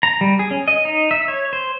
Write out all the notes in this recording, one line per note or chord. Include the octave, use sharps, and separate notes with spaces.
A#5
G3
G#4
C#4
D#5
D#4
E5
C#5
C5